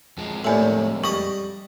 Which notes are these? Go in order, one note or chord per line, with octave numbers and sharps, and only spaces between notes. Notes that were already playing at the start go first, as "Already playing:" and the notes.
F2 G#3
D#2 A2 D5 G#5 F#7
G3 D#5 C#6